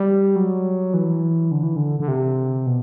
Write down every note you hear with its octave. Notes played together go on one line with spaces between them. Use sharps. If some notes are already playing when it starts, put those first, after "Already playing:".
Already playing: G3
F#3
E3
D3
E3
D3
D3
C3
B2